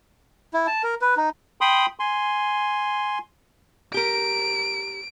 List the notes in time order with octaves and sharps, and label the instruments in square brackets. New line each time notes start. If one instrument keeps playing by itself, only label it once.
[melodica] E4
A5
A#4
B4
D#4
[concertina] G5 B5 C6 D#6
G#5 C6
[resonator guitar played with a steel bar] G4 A#4 [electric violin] D7